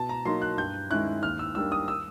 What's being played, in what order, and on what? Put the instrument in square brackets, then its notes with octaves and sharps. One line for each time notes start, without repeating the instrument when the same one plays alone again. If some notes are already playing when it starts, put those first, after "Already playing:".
Already playing: [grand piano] B2 A5
A#5
F#3 A#3 D#4 C6
F#6
G2 G6
D#3 G#3 C#4 E4 F#6
D#2 F6
E6
D#3 G3 A#3 D4 E6
D#6
E6